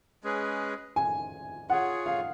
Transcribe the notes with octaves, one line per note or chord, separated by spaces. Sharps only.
G#3 C#4 G#4 B4
G#5
F4 G#4 C#5 F#5
F5